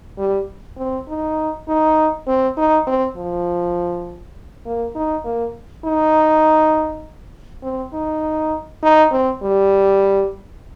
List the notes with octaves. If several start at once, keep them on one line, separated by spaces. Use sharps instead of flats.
G3
C4
D#4
D#4
C4
D#4
C4
F3
A#3
D#4
A#3
D#4
C4
D#4
D#4
C4
G3